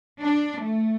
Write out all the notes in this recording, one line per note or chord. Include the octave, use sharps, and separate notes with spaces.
D4
A3